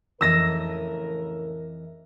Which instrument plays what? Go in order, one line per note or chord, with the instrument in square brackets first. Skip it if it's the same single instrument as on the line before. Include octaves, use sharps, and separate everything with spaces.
[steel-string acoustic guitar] F2 E3 D#5 [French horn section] A2 C#3 A#4 [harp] E6 A#6